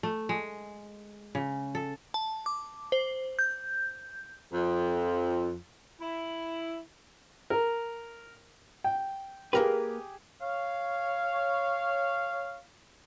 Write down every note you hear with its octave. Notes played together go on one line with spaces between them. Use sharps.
A3
G#3
C#3
A4
A5
D6
C5
G6
F2
E4
A#4
G5
A#3 G4 G#4 A#4 B4
C#5 F5